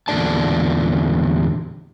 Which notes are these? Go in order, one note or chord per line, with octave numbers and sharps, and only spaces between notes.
E2 A#2 D3 D5 A5